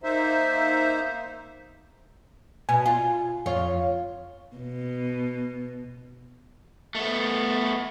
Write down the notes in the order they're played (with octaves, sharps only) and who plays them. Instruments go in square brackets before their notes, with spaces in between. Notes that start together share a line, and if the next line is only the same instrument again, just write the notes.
[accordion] A#3 D#4 C5 E5
[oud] B2 [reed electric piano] G#5
[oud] F4
[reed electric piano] F2 C#5 F5 [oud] F4
[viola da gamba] B2
[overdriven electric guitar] A3 B3